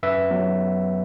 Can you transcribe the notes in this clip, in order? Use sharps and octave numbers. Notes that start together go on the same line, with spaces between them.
F#2 B4 E5
F#3 B3